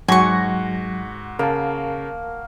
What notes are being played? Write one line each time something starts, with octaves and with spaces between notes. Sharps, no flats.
G#2 F#3 F#4 F#5 G#5 C#6
C#3 A#3 A#4 F5 A5